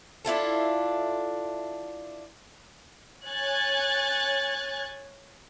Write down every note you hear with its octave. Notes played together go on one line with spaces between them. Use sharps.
D4 E4 F4 A4
C#5 G#5 F#6 G#6 A6